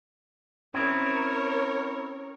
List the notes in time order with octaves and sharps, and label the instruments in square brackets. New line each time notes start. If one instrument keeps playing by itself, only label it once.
[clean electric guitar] C4 E4 [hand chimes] C#4 D#6 [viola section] A#4 C#5